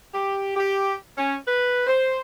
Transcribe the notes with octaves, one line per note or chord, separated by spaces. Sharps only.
G4
G4
C#4
B4
C5